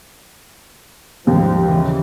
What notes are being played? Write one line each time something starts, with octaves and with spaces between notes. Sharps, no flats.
D#2 G#2 F3 G3
C#3 E3